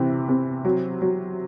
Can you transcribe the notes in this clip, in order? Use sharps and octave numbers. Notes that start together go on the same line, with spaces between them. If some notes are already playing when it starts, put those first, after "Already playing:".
Already playing: C3 E3
C3
F#3
F#3